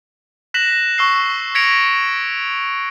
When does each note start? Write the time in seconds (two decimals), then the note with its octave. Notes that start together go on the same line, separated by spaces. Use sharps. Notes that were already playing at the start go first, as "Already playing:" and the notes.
0.54 F#6 A#6 B6 E7 F#7
0.98 C#6 E6 C7
1.55 G#6 A#6 B6 C#7 D7 F7